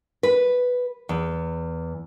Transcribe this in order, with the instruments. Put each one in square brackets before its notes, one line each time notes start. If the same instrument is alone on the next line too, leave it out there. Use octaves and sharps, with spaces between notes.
[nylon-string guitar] B4
E2